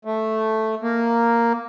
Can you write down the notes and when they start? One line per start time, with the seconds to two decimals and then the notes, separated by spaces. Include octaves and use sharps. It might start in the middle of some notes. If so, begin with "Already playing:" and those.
0.05 A3
0.82 A#3